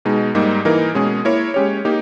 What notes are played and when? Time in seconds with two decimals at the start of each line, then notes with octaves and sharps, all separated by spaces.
0.05 B2 G#3 D#4
0.35 G#2 G3 A#3 D#4
0.65 E3 A#3 D#4 A#4
0.95 B2 G#3 C#4 G#4
1.25 A#3 E4 A#4 C#5
1.54 G#3 C#4 G4 C#5
1.85 A#3 D#4 G4